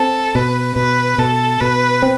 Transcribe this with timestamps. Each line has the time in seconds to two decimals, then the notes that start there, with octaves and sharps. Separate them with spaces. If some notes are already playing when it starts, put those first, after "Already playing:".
Already playing: C4 A4
0.35 B2 B4
0.76 B2 B4
1.18 B2 A4
1.60 B2 B4
2.02 C4